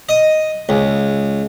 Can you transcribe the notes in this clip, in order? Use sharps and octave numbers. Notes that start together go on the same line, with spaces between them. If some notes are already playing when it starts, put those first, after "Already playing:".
D#5
C#2